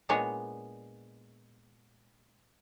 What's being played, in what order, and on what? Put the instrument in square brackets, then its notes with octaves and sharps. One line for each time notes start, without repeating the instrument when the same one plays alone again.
[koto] A#2 G#3 B3 D4 C#5 D#5